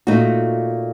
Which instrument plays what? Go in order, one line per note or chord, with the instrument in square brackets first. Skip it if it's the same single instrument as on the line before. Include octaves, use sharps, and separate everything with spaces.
[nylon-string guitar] A#2 A3 D#4 F#4